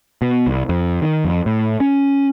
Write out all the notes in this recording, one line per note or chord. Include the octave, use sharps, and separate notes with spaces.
B2
C2
F2
D#3
F2
A2
C#4